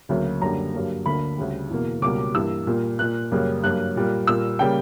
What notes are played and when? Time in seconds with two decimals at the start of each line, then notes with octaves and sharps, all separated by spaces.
0.09 D2 C#3 F#3 A#3
0.42 F#2 D3 G3 A#3 A#5
0.73 G2 F#3 A#3
1.06 D2 D3 A#3 B5
1.37 D2 C#3 G3
1.70 E2 B2 A#3
2.02 C#2 B2 G3 A#3 D6
2.34 G2 E3 A#3 E6
2.67 A#2 G3 A#3
2.99 A#2 A#3 F#6
3.32 F#2 C#3 G3 A#3
3.64 G2 F#3 A#3 F#6
3.96 A#2 G3 A#3
4.27 A#2 G3 A#3 E6
4.59 C#3 G3 A#3 G5